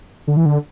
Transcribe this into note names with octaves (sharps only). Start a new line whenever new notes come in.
D3
E3
D3